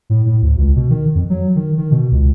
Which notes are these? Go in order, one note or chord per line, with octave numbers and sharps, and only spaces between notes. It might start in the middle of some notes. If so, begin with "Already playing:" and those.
A2
A2
D2
C#2
B2
D#3
F2
F#3
D#3
D#3
B2
C#2